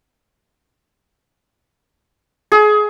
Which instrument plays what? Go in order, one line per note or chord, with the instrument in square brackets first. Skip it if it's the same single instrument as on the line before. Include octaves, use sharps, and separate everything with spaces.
[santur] G#4